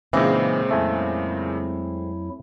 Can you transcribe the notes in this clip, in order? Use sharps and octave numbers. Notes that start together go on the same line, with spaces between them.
A#2 C#3 E3 G#3 A#3 C4 D#4
F2 F#3 A3 E4 G#5